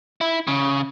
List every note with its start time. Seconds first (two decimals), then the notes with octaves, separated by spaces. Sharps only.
0.21 E4
0.48 C#3